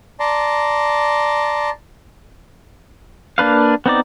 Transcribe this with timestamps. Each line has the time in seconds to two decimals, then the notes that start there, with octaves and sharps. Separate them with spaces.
0.20 D5 A5 A#5 C6
3.38 A#3 D4 B4 F5
3.86 B3 C4 D#4 D5